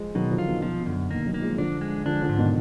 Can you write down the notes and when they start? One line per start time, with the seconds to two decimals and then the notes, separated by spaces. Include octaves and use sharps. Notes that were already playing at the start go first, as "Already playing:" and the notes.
Already playing: F3 G#3
0.15 B2 D#3 F#3
0.31 D3 F3
0.38 F4
0.47 B2 D#3
0.62 B2 F3
0.80 B2
0.86 F#2 D3
1.10 B2 D#3 A#3
1.26 D#3 F#3
1.34 A#3
1.42 F3 G#3
1.58 D3 F3 D4
1.81 G#3
2.05 D3 F3 D4
2.22 D3 F3
2.29 G#2
2.38 B2 D#3